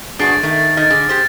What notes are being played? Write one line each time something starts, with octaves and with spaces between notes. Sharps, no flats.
G1 D4 F#4 G#4 D#6 A6 C7 D7
D#3 A3
D#3 D#5 F6 A6
D3 G#4
G4 C5